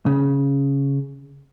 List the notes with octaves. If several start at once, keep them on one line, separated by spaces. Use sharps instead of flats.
C#3